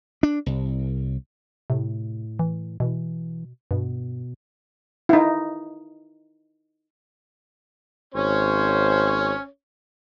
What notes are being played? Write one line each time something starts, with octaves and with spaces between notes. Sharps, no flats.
D4
C2
A2 C3
E3
B2 E3
G2 B2
D#4 E4
G#1 C#4 C5 C#5